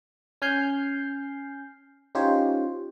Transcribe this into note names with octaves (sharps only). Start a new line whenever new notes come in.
C#4 G#5 F6 G6 C7
C#4 D#4 F4 G4 C5 C#5